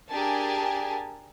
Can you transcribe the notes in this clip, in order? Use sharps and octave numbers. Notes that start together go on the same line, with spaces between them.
D4 G4 G#4 A#4 G#5 A5